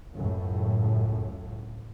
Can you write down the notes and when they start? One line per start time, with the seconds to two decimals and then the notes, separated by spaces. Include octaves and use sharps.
0.15 C#2 F#2 A2